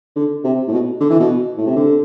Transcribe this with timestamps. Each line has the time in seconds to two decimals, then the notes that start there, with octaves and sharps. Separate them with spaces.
0.16 D3
0.44 C3
0.67 A2
0.73 B2
1.00 D3
1.10 E3
1.19 B2
1.57 A2
1.66 C3
1.76 D3